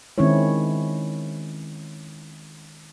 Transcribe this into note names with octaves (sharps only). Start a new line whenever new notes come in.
D#3 G#3 C4 C#4 E4 C#5